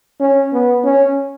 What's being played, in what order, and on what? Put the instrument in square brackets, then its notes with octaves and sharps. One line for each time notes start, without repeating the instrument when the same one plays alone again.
[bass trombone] C#4
B3
C#4